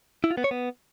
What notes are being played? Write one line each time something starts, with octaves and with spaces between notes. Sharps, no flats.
E4
F4
B3
C#5
B3